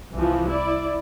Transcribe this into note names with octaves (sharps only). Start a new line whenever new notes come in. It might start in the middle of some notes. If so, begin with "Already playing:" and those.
C2 E3 F3
E4 D5